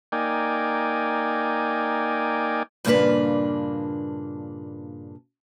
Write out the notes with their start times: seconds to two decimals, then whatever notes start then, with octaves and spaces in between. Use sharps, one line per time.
0.12 A#3 D#4 D5 G5 G#5
2.85 G2 A#2 C#3 A#3 D4 B4